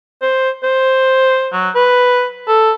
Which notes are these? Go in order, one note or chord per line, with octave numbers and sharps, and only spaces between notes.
C5
C5
F#3
B4
A4